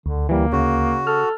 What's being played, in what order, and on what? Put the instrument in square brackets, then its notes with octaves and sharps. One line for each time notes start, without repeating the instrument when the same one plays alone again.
[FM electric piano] D2 [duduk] D3
[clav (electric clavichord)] E3 G3 [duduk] A#3
[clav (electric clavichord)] C#3 [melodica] F#4
[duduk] A4 [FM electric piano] F6